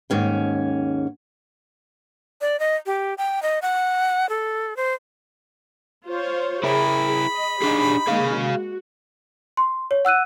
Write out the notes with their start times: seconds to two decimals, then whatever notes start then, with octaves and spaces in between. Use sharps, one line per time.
0.10 D#2 G#2 C#4 G5
2.41 D5
2.60 D#5
2.86 G4
3.18 G5
3.42 D#5
3.62 F#5
4.29 A4
4.77 C5
6.06 F4 C5 C#5
6.64 E4 G#4 A#4 B5
7.31 D#5
7.62 D4 D#4 G4 G#4
8.08 G#3 A#3 D#4 G#4 F5
8.36 F#4
9.57 C6
9.91 C#5
10.05 F#5 E6 F#6 D#7